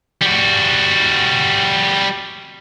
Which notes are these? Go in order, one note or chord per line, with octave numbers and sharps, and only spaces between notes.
G3 F#4